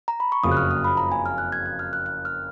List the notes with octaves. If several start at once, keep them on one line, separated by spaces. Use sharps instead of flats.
A#5
B5
C#6
F#1 F2 C#3 F#3 A#3 D#6
F#6
F6
D#6
B5
A#5
G#5
F6
F#6
G#6
F#6
F6
F#6
F#6
F6